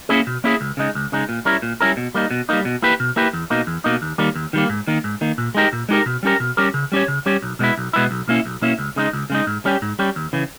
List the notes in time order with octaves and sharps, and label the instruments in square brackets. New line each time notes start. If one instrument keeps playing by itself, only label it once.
[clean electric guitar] A#3 C#4 E4 G#4
B2
A#3 C#4 E4 G#4
C#2
C#3 G#3 D#4
C#2
C#3 G#3 D#4
A#2
G3 C#4 E4 A#4
A#2
G3 C#4 E4 A#4
B2
G3 A#3 D#4
B2
G3 A#3 D#4
B2
A#3 E4 G4 B4
B2
A#3 E4 G4 B4
E2
B2 A#3 D#4
E2
B2 A#3 D#4
D#2
D#3 G3 A#3
D#2
D#3 G3 A#3
G#2
D#3 A#3
G#2
D#3 A#3
A#2
G#3 D#4 G4 A#4
A#2
G#3 D#4 G4 A#4
B2
G3 C#4 G4 A#4
B2
G3 C#4 G4 A#4
C#3
G3 C#4 G4 C#5
C#3
G3 C#4 G4 C#5
B1
B2 G#3 B3 E4
B1
B2 G#3 B3 E4
B1
B2 A#3 C#4 E4
B1
B2 A#3 C#4 E4
C#2
C#3 G#3 D#4
C#2
C#3 G#3 D#4
G#2
G3 C#4 G4
G#2
G3 C#4 G4
D#2
C#3 E3